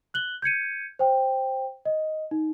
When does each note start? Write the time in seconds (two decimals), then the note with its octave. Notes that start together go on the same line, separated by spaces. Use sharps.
0.14 F#6 F#7 G7
0.42 G6 G#6 C#7 D#7
0.99 C5 G5
1.85 D#5
2.31 D#4